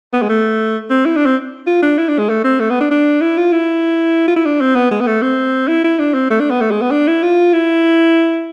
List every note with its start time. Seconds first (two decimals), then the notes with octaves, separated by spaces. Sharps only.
0.13 B3
0.22 G#3
0.29 A3
0.90 C4
1.05 E4
1.16 D4
1.26 C4
1.67 F4
1.82 D4
1.98 E4
2.08 D4
2.19 G#3
2.29 A3
2.44 C4
2.60 A3
2.70 B3
2.81 D4
2.91 D4
3.21 E4
3.38 F4
3.53 E4
4.28 F4
4.36 E4
4.45 D4
4.61 C4
4.75 B3
4.91 G#3
5.01 B3
5.07 A3
5.22 C4
5.68 E4
5.84 E4
5.99 D4
6.14 C4
6.31 A3
6.40 D4
6.51 B3
6.61 A3
6.71 G#3
6.82 B3
6.91 D4
7.07 E4
7.23 F4
7.53 E4